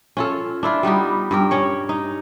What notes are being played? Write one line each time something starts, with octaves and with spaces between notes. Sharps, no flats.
C#4 F4 A4
D4 E4 F4
G3 B3 D#4 G4
G2 G4 A#4
C#4 C#5
D#4